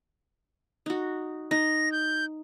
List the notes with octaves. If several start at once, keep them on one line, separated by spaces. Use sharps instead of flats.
D#4 F#4
D#4 A#6
G6